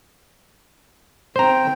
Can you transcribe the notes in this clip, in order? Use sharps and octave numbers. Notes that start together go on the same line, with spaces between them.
C4 C5 G5 A#5